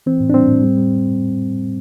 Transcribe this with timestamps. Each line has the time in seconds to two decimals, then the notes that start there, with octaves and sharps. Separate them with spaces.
0.06 E3 C4
0.20 A2
0.30 D4
0.34 G3 C4
0.48 A2
0.63 G3
0.77 G3